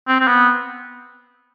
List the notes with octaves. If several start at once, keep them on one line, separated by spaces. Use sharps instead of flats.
C4
C4
B3